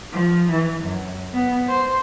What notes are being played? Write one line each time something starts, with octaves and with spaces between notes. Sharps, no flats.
F3
E3
F#2
B3
C5